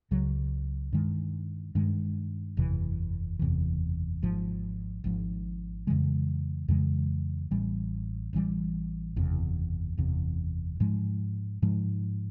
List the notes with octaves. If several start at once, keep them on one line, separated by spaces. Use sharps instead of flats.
C#2 C#3 F#3
G2 D#3 G#3
G2 D#3 G#3
F#1 E2 C3 E3
F#1 E2 C3 E3
G#1 G#2 F3
G#1 G#2 F3
F2 C#3 E3 G#3
F2 C#3 E3 G#3
A1 A2 E3 G3
A1 A2 E3 G3
F#1 E2 C3
F#1 E2 C3
G#2 F3 G#3
G#2 F3 G#3